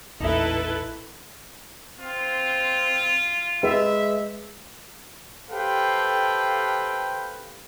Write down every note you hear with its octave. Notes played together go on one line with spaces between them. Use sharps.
A1 E2 A#2 D#4 E4 A4 B4 E5
C4 F4
G#3 B4 E5
G4 A4 B4 C5 F5 G5